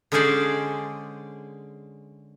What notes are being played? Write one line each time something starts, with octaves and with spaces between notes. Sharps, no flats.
D3 G#3 C#4 G#4 C5 D5